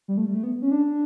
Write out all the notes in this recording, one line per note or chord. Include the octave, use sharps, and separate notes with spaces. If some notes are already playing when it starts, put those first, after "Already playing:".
G3
A3
G3
A3
B3
C#4
D4